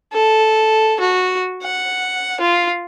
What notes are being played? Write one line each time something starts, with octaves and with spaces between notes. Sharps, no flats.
A4
F#4
F#5
F4